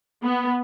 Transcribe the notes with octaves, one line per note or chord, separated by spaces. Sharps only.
B3